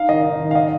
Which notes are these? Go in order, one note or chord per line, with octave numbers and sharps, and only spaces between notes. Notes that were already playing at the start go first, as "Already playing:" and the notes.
Already playing: D#4 F5
D#3 D#5
D#4
D#3
F5
D#5